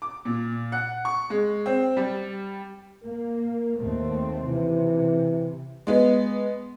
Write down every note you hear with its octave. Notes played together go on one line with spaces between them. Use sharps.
D6
A#2
F#5
C#6
G#3
C4
G3
A#3 A#4
D#2 A3 C4
C3 E3
G#3 B3